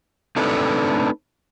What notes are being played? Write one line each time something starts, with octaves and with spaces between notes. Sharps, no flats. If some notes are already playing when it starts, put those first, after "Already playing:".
A3 C4 D4 D#4 A4 B4